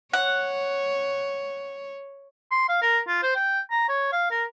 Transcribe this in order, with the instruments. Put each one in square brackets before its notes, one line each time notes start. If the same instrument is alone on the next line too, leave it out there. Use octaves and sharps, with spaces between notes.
[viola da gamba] C#5 [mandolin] F#5
[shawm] C6
F5
A#4
F4
C5
G5
A#5
C#5
F5
A#4